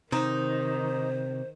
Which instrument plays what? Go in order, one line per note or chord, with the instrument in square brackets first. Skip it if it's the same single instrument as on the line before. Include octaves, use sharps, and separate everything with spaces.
[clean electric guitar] C3 [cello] D#3 [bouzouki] D#4 [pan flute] C5